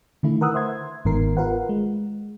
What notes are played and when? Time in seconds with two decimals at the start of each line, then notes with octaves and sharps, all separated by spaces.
0.23 D3 D#3 A3 E4
0.41 A#4 B4 F#5 D#6 E6 F#6
0.54 C5 E5 C6 G#6
1.05 G1 G#2 D#3 B3 A#4 C7
1.37 F4 A#4 B4 F#5
1.69 G#3